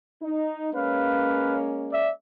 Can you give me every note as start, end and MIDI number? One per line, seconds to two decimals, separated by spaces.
0.22 0.67 63
0.73 2.09 56
0.73 2.09 58
0.73 2.09 61
0.73 1.56 71
0.73 1.56 77
1.90 2.09 74
1.90 2.09 76